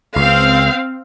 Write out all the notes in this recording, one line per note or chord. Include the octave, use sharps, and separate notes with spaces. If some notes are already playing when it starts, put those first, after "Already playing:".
C#2 C4 F5